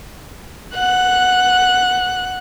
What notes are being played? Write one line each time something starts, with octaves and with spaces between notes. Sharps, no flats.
F#5 F#6